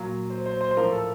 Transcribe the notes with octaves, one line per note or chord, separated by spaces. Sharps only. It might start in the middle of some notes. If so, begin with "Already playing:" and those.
Already playing: A#2 F#3
C5
C5
C5
C5
A2 F3 A#4
A4